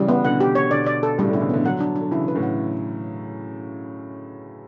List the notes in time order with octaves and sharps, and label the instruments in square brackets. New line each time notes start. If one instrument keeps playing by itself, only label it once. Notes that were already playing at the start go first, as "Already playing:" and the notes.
Already playing: [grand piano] C#3 E3 [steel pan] G3
[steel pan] B3
[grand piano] B2 D3 [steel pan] F#5
[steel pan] G4
C#5
[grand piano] B2 D3 [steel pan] D5
[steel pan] D5
A4
[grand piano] A2 C#3 [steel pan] G3
[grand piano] B2 D3
[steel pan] E4
[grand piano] C#3 E3
[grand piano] B2 D3 [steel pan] B3
[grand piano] D3 F#3 [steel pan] F#5
[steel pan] D4
D4
[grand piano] D3
[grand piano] C#3 E3 [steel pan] E4
[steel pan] B4
[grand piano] A2 C#3
[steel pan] F#5